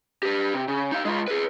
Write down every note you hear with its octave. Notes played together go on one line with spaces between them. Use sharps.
G4 B4
C3
C#3
D#4 F5
G#3 F4
G#4 B4